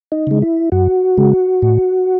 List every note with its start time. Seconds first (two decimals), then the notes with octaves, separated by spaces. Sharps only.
0.12 D#4
0.27 C#3 G#3
0.42 E4
0.72 F#2 F#4
1.18 C#3 G#3
1.62 A2